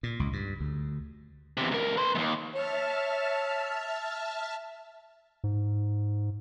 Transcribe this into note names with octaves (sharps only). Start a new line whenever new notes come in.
A#2
C#2
G2
D2
E2 C3
C#2 A#4
B4 C6
D#2 G#3
C#5 E5 A5 F6
G#2